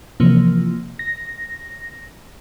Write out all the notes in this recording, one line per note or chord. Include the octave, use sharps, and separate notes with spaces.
C3 E3 F3 A#3
A#6